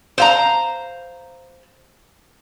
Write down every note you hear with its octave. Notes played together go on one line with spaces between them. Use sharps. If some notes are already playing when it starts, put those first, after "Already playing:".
C5 F5 A#5